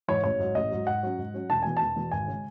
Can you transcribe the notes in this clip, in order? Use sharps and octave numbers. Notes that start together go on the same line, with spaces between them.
G#2 E3 C#5
A1 C#5
G#2 F#3
A1 D#5
G#2 F#3
G#2 F#5
F#3 C#4
G#2
F#3 C#4
E1 A5
E2 B2 G#5
E1 A5
E2 B2
G#1 G#5
C#3 G#3 C#4